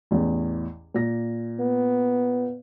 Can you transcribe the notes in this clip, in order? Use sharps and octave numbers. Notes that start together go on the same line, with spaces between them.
A1 E2
A#2 A#6
B3